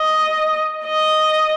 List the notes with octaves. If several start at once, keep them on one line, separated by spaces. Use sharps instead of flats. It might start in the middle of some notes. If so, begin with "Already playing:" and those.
Already playing: D#5
D#5